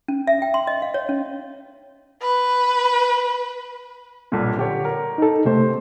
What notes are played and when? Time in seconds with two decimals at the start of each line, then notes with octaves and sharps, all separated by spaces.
0.08 C#4
0.27 E5
0.42 G5
0.54 C6
0.67 D#5
0.82 F5
0.94 C#5
1.09 C#4
2.22 B4
4.32 B1 G2 A#2
4.57 D3 G4 C#5
4.85 A#4
5.18 D#4 A4
5.45 C3 A3 G4 C5